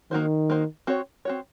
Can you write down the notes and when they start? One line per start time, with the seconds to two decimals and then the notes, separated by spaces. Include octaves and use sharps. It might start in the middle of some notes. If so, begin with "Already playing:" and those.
0.11 D#3 A#3 D#4 F#4 C5
0.50 A#3 D#4 F#4 C5
0.87 C4 F#4 C#5
1.25 C4 F#4 C#5